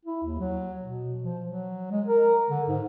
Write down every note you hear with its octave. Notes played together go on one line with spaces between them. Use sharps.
E4
D#2
F#3
B2
F3
F#3
G#3
A#4
D3
G#2